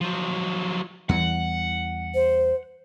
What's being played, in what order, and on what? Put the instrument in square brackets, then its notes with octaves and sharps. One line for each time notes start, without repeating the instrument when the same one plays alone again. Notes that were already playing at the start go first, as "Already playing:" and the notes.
[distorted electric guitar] F3 F#3
[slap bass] E2 E3 G3 [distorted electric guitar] F#5
[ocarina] C5